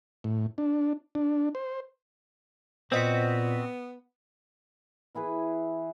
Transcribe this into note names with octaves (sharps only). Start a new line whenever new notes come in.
A2
D4
D4
C5
A#2 B3 C4 F#4 C5 D#5 B6
E3 E4 G#4 B4